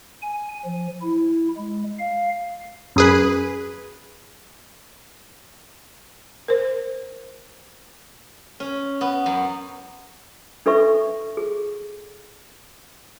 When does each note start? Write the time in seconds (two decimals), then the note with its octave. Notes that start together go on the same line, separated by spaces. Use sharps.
0.22 G#5
0.65 F3
1.02 E4
1.57 G#3
1.99 F5
2.96 F#2 G#4 B4
6.48 A#4 C5
8.60 C#4
9.01 B3
9.26 F#2
10.66 D4 A4 B4 E5 C#6
11.37 G#4